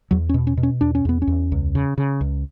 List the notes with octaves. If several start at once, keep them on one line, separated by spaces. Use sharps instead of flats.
E2 F#3
C#4
B2
C#4
B2
C#4
E2 D4
C#4
E2 B3
C#4
E2
C#2
C#3
C#3
C#2